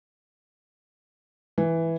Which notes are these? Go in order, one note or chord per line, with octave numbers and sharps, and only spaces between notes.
E3